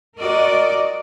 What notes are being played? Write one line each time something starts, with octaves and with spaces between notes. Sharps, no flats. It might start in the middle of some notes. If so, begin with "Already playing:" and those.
F#4 A#4 D5 D#5